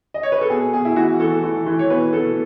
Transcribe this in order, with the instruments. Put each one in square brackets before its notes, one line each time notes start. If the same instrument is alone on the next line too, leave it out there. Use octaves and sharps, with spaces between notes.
[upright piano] D#5
C#5
B4
A4
B2 G#4
B2 G#4
E4
E3 F#4
E3 A4
E3
E3
C#5
B2 B4
B2 A4